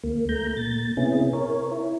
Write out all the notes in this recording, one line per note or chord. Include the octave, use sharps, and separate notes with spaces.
D2 A#3
A3 A#5 G6
A#2 A6
C3 B3 C#4 E4 G#4
A#4 C#5
E4